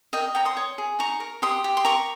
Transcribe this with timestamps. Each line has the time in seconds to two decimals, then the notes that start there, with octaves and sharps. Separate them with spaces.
0.13 A#4 D#5 G5
0.35 C#5 G5 A#5
0.45 C6 D#6
0.57 C#5
0.78 G#4
0.99 D#4 A#5 C#6
1.20 A#4
1.42 G4 C6 D#6
1.64 G4
1.77 C6
1.85 A#4 A#5 C#6